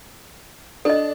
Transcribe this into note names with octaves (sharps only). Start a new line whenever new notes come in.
D4 A4 D#5